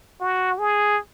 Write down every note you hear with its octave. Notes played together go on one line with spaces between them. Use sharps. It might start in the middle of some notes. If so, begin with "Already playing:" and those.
F#4
G#4